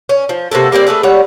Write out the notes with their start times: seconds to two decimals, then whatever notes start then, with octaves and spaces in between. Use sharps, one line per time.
0.09 C#4
0.29 F3
0.51 C3 A#3 F#4 A4
0.72 G3 A#3 C4 D4
0.87 A3 G#4 A4 B4
1.03 G3 C#5 F#5